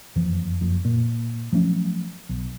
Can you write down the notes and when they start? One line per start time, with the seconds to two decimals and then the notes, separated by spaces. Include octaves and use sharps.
0.16 F#1 F2 E3 F3
0.61 F#1 F2
0.85 A#2
1.53 F3 F#3 A3 C#4
2.29 B1